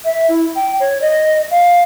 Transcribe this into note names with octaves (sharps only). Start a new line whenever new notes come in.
E5
E4
G5
C#5
D#5
F5